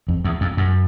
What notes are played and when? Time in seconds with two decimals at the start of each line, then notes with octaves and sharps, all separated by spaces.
0.08 F2
0.24 E2
0.41 F2
0.57 F#2